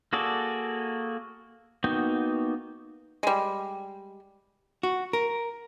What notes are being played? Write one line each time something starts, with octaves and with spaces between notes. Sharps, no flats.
A#3 F#4 G#4 A4 D5
A#3 B3 D#4 F#4 G5
G3 G#3
F#4
A#4